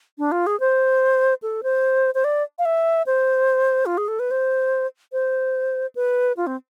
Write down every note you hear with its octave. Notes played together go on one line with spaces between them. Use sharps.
D4
F4
G#4
C5
A4
C5
C5
D5
F5
E5
C5
F4
G#4
A4
B4
C5
C5
B4
F4
C4